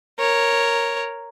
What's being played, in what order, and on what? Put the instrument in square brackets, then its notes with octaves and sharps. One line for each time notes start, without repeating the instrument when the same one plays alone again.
[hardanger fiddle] A#4 C#5